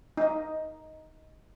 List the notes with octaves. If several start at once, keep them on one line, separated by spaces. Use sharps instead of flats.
D#4 D#5